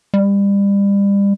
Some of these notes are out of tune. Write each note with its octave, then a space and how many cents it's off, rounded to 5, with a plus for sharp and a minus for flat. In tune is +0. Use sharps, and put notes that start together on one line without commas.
G3 +30